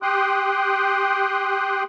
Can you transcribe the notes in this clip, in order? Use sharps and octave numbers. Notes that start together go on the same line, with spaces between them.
G4 G5 C6 D#6 F#6